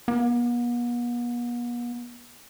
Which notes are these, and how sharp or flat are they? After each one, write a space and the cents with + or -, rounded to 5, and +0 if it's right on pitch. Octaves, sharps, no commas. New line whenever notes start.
B3 -45